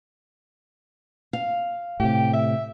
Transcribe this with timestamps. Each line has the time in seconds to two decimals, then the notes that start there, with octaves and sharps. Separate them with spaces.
1.33 F5
2.00 A2 C3 G4
2.33 E5